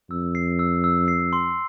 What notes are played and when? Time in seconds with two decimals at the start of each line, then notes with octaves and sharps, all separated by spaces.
0.10 F2 E6
0.35 C7
0.59 E6
0.84 E6
1.08 C7
1.33 C6